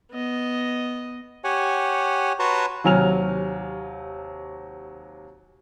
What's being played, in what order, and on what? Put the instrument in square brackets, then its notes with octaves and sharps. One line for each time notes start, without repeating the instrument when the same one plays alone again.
[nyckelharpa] B3 D#5
[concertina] G4 C#5 F#5 G#5
F#4 B4 C#5 A5 A#5 C6
[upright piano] D#2 C3 F#3 G#5 F6 F7